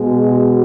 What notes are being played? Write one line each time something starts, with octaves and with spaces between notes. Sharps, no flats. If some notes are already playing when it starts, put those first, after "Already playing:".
Already playing: B2 G#3 G#4
F#4